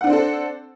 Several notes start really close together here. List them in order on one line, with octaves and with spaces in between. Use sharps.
F#5 D4 C4 C5 A4